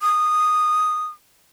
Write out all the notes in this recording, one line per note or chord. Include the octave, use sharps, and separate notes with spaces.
D#6